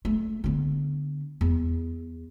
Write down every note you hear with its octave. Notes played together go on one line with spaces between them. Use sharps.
A3
D3 B3
E2